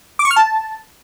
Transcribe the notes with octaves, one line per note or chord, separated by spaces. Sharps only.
D6
C#6
F6
A5